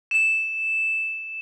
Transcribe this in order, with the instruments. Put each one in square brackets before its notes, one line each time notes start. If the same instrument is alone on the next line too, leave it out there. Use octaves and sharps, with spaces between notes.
[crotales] E7